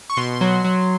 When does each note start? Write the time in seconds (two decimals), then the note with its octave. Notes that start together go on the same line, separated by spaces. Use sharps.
0.10 C#6
0.17 B2 C6
0.41 F#3
0.64 F#3